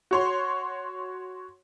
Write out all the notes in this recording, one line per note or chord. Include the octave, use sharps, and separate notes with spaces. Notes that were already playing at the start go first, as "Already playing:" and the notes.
F#4 C#5 C6